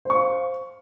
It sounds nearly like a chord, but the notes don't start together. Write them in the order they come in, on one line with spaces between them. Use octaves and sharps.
C5 C#6 F5